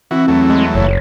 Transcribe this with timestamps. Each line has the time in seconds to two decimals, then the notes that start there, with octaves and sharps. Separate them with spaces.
0.11 E3 C4 F#4
0.28 E2 F#3 A3
0.50 G#3
0.75 F#1 C#5